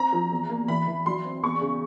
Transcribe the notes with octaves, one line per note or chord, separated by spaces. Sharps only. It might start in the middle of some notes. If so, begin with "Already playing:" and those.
Already playing: C4 A#5
F3
E2
A#3
E3 B5
E3
F#3 C6
C4
E2 C#6
C#3